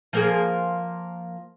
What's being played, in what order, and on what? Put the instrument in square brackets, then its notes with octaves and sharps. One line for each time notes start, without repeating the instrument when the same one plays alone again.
[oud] F3 A#3 G#4